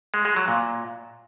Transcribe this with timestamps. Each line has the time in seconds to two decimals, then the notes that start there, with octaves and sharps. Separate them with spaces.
0.14 G#3
0.25 G#3
0.36 F#3
0.48 A#2